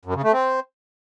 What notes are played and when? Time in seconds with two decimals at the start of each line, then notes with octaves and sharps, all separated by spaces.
0.05 F#2
0.14 C#3
0.24 A3
0.33 C4